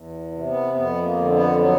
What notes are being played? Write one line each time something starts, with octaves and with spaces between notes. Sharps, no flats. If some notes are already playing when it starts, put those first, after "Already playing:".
Already playing: E2
C3
B3
F2 B3
A#3
D3
B3
F#3 B3